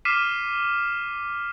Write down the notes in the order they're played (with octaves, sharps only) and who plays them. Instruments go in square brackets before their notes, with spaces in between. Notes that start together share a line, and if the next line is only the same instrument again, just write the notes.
[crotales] D6 F6 B6 C7 D#7 E7